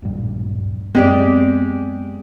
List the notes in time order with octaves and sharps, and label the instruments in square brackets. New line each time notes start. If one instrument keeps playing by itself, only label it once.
[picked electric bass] D1 A#1 G2
[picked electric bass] F#2 [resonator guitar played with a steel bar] G#3 G4 D5 [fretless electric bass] B3 C4